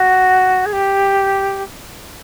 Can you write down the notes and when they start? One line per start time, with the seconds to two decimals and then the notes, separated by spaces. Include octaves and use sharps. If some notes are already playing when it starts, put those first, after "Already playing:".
Already playing: F#4
0.65 G#4
0.72 G4